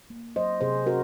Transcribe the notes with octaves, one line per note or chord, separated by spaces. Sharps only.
A#3
F#3 C5 D#5
C3 G#4 C5
C#4 F#4 A#4